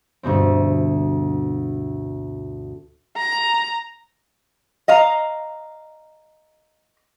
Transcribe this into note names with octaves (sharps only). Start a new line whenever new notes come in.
D2 G2 B2 C4
A#5
D#5 F5 A#5